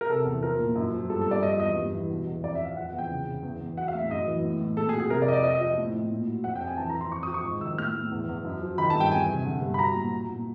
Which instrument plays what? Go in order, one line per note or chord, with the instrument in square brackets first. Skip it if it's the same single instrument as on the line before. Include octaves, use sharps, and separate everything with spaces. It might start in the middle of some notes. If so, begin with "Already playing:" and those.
[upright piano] A#4
C3 A4
E2
F3 A#4
A#2
F#2
F3
G2 A4
A4
G2 D5
F3 D#5
E2 D#5
G2
E3
B2
E2
F2 D5
E5
F2 F5
F3 F#5
F#5
E2
G5
C#3
C#3
E2
E2
F#3 F#5
F5
A2 E5
F#2 D#5
E3
A2
A2
A#2 A4
G#4
F#3
G#4
C3 A#4
D5
F2 D#5
D5
F3 D#5
D#5
F3
A2
A2
A#2
F#3
F2 F#5
G5
F2
G#5
E3 A5
A#5
E3
C6
F2 C#6
D#6
F3
C#6
G#2
D#3 E6
A2 F6
A2
E2
E2
F#2
F3
D#3 B5
A5
G2
G5
E2 G#5
C3
D3
G2
B5
F#3 A#5
A#2
F#3
A#2